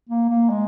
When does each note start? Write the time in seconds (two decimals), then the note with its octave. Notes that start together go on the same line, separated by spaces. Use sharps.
0.09 A#3
0.30 A#3
0.50 G#3